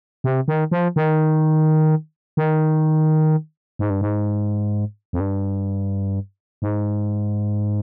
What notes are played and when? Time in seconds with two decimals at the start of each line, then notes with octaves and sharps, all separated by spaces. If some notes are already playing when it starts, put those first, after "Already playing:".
0.24 C3
0.48 D#3
0.71 F3
0.96 D#3
2.37 D#3
3.79 G#2
3.90 G2
4.01 G#2
5.13 F2
5.20 G2
6.62 G#2